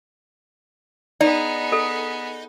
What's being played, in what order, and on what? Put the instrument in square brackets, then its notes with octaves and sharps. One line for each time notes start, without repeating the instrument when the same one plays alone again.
[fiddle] B3 G#4 [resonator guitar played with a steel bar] D#4 [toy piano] D5
[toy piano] A4